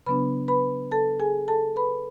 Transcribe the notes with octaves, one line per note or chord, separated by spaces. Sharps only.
C#3 F#3 B3 D4 B4 B5
B4 B5
A4 A5
G#4 G#5
A4 A5
B4 B5